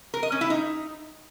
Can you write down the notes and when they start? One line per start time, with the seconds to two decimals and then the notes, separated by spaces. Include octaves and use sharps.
0.14 A#4
0.23 D#5
0.32 C#4
0.41 E4
0.50 D#4